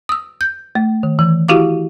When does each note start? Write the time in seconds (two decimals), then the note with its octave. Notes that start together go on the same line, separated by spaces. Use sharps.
0.09 D#6 E6
0.41 G6
0.75 A3
1.03 D#3
1.19 E3
1.48 E4 F#4 G4 F5 D6